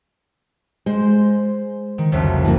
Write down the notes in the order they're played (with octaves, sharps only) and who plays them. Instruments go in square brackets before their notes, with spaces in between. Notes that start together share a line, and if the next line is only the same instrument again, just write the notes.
[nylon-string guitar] G#3 [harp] C5
[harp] D#3
F#1 C2 F2
[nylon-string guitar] E3 A#3